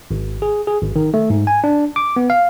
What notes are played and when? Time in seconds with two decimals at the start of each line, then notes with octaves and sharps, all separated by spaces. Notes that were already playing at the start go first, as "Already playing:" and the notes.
0.11 G#1
0.42 G#4
0.67 G#4
0.82 G#1
0.96 D#3
1.14 A3
1.30 G#2
1.47 G#5
1.64 D4
1.96 D6
2.16 B3
2.30 F5